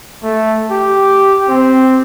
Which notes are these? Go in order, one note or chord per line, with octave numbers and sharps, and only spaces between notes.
A3
G4
C4